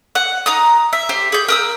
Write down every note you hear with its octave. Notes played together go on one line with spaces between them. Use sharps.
F#5
D#4 A#5 D#6
E5
G4 C5
G#4 G6
A#4 D#6 E6